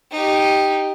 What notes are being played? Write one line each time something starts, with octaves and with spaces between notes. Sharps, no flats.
D#4 G4